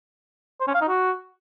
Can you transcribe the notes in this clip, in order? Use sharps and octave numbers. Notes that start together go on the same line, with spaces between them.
C5
C#4
F5
D#4
F#4